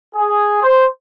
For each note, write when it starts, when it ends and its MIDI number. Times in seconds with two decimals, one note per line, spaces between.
0.15 0.60 68
0.63 0.86 72